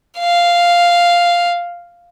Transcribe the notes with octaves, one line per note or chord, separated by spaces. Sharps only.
F5